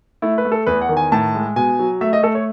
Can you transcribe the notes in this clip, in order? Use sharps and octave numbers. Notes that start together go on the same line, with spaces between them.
A3 E4
B4
A3
A4
E2 B4
F#5
D#3
G#5
A2 A5
G#3
B2 G#5
F#3
A3 E5
D#5
A3 A4
C#5